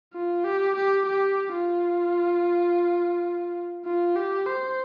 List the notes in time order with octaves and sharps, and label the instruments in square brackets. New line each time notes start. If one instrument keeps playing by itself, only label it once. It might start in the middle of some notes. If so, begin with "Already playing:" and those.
[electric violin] F4
G4
G4
G4
F4
F4
G4
C5